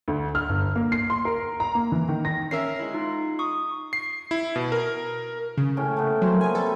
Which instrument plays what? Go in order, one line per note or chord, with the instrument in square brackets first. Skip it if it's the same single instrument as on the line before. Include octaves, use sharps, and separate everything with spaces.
[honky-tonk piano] D2
F6
G1
A#3
C7
C6
A#4
A#5
A#3
E3
D#3
A#6
[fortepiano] C#4 A#4 E5 [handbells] C7
[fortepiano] G#3 E4
[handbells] D#4 F4
C#6 D#6
[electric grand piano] C7
E4
B2
A#4
[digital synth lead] C#3
[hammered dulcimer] A2 C#4 G5
A3 B3 E4
[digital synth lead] F#3 [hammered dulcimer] A#3 C5
[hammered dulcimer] B3 C#4 [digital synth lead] G#5
[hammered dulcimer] C3 G3 [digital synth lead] A4